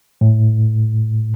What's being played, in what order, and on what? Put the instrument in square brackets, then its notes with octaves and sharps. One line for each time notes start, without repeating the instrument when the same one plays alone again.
[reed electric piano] A2